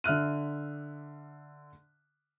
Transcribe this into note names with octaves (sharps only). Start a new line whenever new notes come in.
D3 E5 F6 F#6 D#7